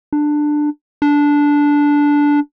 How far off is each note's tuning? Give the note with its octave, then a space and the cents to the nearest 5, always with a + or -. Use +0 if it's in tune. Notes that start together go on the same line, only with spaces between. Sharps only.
D4 +15
D4 -10